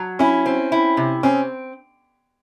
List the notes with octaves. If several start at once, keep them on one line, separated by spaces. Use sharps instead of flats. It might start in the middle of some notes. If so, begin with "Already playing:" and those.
Already playing: F#3
C#4 E4
C4
E4
C3
C4 C#4